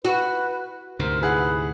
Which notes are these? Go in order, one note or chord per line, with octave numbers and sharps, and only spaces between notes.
F#4 B4
D2 G#2 C3 A#4 C5
E4 G#4 B4 F#5